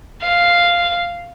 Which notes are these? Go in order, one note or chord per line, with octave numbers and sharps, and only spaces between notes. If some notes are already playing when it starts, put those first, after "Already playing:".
F5